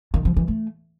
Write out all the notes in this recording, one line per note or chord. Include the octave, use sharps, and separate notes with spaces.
D#3
F3
E3
A3